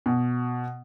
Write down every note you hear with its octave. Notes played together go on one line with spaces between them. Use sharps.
B2